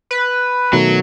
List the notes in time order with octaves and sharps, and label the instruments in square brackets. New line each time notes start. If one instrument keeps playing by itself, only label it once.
[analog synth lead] B4
[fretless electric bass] B2 D#3 A3 [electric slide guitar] F#3